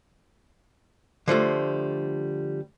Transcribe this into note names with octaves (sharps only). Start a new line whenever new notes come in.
D3 F3 G3 A3